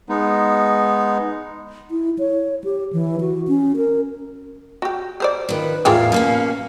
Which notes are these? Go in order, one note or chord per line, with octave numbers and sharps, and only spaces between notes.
G#3 B3 D#4
E4
C#5
G4
E3
F#4
C#4
A#4
F#4 G4
G4 C5 D5
D#3 F3 B4
E2 A2 F4 G4 G#4 A#4 F5
B2 A#3 B3 C#4